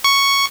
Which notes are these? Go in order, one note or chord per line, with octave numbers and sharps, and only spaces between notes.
C#6